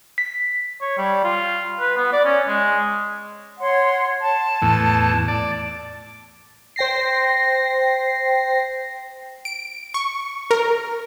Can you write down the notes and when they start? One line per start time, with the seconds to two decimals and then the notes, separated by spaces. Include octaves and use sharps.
0.18 B6
0.81 C#5
0.98 G3
1.24 F4
1.80 B4
1.97 B3
2.12 D5
2.25 C#4
2.48 G#3
3.60 C#5 F#5 C6
4.20 A5
4.62 E2 A2
5.28 D5
6.76 C5 G5 A#6 C7
9.45 D7
9.94 C#6
10.51 A#4